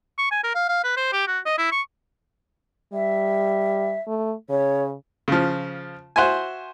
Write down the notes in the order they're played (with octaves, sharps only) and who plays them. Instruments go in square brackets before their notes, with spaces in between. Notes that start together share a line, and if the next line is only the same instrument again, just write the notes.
[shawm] C#6
G#5
A#4
F5
F5
B4
C5
G4
F#4
D#5
E4
C#6
[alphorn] G3 [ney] E5
[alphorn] A3
[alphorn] C#3 [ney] C#5
[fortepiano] C#3 F3
F#4 C5 E5 G#5